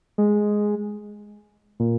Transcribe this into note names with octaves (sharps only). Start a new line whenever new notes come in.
G#3
A#2